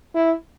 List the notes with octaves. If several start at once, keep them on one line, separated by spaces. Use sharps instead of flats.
E4